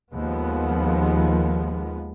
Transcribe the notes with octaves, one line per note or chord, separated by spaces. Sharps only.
D#2 F3 G#3 B3